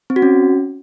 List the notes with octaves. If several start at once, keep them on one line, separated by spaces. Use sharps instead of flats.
C4
F#4
C#4